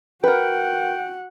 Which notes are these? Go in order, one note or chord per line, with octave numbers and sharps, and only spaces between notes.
F#4 A#4 B4 F#5 G5